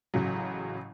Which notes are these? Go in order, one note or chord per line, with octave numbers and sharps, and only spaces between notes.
A1 C#3 F#3